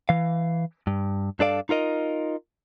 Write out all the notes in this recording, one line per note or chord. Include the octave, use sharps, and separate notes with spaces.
E3 F5
G2
G2 D4 A4 D5 F5
D#4 F4 A#4 D#5